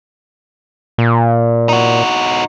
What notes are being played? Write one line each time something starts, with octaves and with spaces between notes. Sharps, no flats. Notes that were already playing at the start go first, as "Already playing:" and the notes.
A#2
D#4 F#4